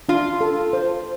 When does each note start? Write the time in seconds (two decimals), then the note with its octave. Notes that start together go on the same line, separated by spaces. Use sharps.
0.09 D4 F4
0.41 A4
0.73 C5